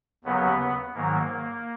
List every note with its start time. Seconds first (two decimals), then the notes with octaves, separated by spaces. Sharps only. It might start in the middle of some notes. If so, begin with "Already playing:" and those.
0.24 D#2 C#3 F#3 B3
0.94 G#2 D#3 F#3 A#3